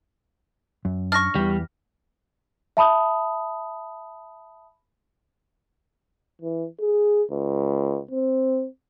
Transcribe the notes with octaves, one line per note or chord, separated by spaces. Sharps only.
F#2
D4 C#6 F6 A#6
E2 E3 G3
E5 A5 B5 D#6
E3
G#4
C#2
C4